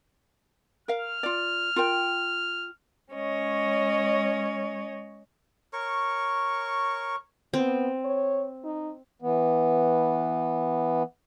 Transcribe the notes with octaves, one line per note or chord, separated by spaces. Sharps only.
A#4 F5 F6
F4 D5
F4 A#4 G5
G#3 C#4 C#5 D#5
A#4 C#5 C#6
B3 C4
C#5
D#4
E3 B3